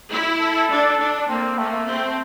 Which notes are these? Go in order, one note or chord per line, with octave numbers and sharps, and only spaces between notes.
E4
A4
D4
D4
A#3 C4
A3 A#3
C4